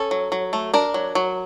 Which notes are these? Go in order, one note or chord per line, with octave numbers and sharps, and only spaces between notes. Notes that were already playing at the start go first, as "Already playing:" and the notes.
Already playing: C#4 A4
F#3
F#3
A3
D4 A#4
F#3
F#3